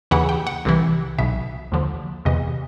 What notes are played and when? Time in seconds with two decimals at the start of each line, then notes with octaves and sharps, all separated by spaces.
0.11 D#2 C#3 E3 F#5
0.29 G5
0.47 F#5
0.65 C2 C3 E3
1.19 B1 B2 E5
1.72 D#2 D3 F3
2.25 E2 C3 E3 D#5